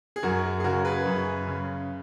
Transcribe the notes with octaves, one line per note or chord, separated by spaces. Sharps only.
G#4
F#2 F#4 A#4
G#4
C#3 F#4 A#4
G#4 B4
F#2
C#3